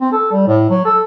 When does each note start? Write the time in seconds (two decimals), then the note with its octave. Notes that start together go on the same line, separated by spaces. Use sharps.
0.01 C4
0.12 A4
0.32 G3
0.47 A2
0.70 F#3
0.85 A4